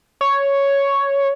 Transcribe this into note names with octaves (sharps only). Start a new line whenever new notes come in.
C#5